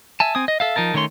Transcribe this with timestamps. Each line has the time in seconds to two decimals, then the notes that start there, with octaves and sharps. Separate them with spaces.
0.20 E5 G#5 A5
0.35 C4 G#5 D#6
0.48 D#5
0.60 A4 E5 F5
0.76 F3 D#4 A#4 A5
0.94 D#3 A3 C#4 C#5 C6